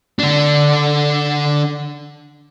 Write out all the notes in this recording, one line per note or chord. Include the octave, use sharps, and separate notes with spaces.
D3 D4